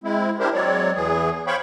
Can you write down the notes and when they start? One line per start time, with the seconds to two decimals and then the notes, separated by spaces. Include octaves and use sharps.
0.04 G#3 C4 E4
0.40 D4 E4 G4 A#4 C5
0.54 F#3 G#3 C4 C#5 D5
0.96 E2 E3 G#4
1.47 C5 C#5 F5 G5 B5 C#6